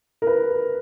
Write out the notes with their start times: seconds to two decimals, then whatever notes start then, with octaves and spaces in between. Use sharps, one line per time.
0.22 A#4
0.27 B4